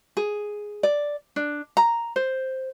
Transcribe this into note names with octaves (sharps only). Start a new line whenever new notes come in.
G#4
D5
D4
A#5
C5